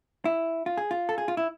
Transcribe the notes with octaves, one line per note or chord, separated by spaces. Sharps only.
E4
F4
G#4
F4
A4
G#4
F4
E4